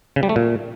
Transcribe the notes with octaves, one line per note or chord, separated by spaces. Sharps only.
C#3
G3
A3
A#2